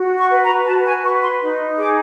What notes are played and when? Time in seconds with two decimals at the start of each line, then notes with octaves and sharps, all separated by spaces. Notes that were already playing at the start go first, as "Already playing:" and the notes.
Already playing: F#4
0.19 C#6
0.31 B4
0.43 A#5
0.67 F#4 A5
0.86 G#5
1.04 B4 C#6
1.22 C6
1.41 D#4
1.78 G#4 D6